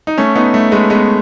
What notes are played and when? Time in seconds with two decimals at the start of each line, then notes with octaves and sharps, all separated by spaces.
0.07 D#4
0.18 A3 C#4
0.35 B3 D#4
0.54 A3
0.72 G#3 B3
0.90 G#3 B3